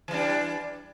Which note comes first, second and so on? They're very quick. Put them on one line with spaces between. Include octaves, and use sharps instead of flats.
E3 G3 D4